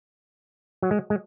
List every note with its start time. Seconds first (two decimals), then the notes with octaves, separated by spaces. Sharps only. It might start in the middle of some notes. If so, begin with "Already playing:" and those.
0.82 F#3
0.91 G#3
1.10 G#3